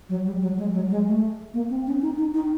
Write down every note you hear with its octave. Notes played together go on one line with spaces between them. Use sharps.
F#3
G3
F#3
G#3
F#3
G#3
A3
A#3
C4
C#4
D#4
D#4
D#4